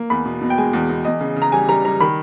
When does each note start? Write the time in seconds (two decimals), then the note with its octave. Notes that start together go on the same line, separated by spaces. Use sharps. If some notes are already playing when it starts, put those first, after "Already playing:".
Already playing: A#3
0.10 E2 B5
0.25 B2
0.41 B2
0.50 G5
0.58 G#3 G#5
0.73 E2
0.89 E2
1.05 E2 D#5
1.20 C#3
1.36 C#3
1.42 A#5
1.52 G3 G#5
1.68 G3 A#5
1.85 G3 A#5
2.00 D#3 B5